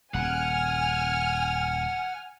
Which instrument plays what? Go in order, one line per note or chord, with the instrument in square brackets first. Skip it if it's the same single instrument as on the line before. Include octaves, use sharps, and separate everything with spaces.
[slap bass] D#1 C#3 [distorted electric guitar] F#5 [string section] G#5 F6